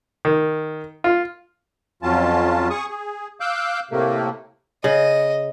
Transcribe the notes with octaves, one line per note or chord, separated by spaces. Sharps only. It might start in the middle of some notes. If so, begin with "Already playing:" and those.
D#3
F4
F2 F#3 C#4 F4 A5
G#4 C#6 D#6
G#4
F5 D6 E6 F#6 G6
A2 C3 A3 A#3
C#3 D#5